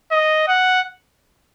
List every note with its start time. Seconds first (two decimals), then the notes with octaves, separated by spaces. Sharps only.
0.11 D#5
0.48 F#5